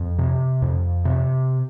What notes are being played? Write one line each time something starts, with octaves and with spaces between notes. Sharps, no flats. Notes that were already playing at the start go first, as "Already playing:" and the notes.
Already playing: F2
C3
F2
C3